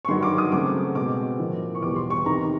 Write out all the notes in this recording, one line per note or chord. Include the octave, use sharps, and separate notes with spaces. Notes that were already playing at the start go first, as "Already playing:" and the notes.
C#6
G2 D#3 F#3 C6
D6
D#6
C#3 F#3 A3 C4 D6
B2 G#3 C4 D6
A2 F3 A#3
C#6
E2 B2 G3 D6
C6
C#6
E2 C3 D#3 A#5